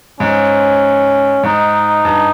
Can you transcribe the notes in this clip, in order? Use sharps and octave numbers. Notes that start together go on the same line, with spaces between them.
G#2 C#4
G#2 D#4
G2